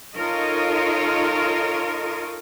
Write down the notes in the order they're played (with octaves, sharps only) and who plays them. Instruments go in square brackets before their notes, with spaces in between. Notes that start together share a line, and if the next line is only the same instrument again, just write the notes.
[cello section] D#4 F4 A4 A#4 C#5 D#5